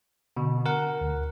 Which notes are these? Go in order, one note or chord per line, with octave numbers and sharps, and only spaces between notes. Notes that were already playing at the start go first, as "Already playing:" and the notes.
B2 D3
A#4 F#5
D2